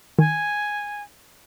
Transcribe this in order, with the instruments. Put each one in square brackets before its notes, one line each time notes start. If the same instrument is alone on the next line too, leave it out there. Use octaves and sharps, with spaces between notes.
[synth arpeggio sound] D#3 [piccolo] G#5